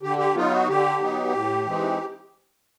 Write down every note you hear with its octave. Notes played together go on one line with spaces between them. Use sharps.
D3 G4
G4
F#3 B3 D#4 F4
F#4
D3 G4
F#3 B3 D#4
A2
E3 G#3 C4 D#4